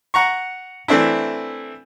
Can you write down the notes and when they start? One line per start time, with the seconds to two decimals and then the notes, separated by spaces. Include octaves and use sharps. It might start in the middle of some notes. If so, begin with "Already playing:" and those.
0.14 F#5 A#5 C#6
0.88 E3 A3 C4 D4 E4